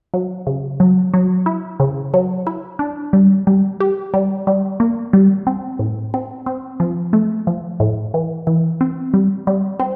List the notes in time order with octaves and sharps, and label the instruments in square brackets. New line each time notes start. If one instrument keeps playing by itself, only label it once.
[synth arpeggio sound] F#3
C#3
F#3
F#3
E4
C#3
F#3
E4
D4
G3
G3
G4
G3
G3
A#3
G3
C4
A2
C4
C4
F3
A3
F3
A2
E3
E3
C4
G3
G3
C4